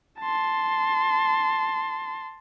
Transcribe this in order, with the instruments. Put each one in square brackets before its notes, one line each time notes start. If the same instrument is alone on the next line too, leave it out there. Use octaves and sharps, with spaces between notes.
[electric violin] A5 C6